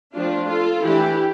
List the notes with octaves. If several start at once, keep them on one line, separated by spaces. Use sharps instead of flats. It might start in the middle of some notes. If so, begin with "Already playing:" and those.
F3 A3 C4 D4 F4
F4 A4
E3 A3 D4 E4 G4